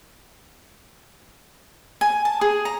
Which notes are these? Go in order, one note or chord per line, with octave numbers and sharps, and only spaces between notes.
G#5
A5
G#4
A#5